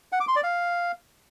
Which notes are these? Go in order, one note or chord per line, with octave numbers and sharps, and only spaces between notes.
F#5
D6
C6
D5
F5